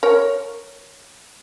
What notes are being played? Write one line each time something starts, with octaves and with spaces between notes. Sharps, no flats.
A#4 C#5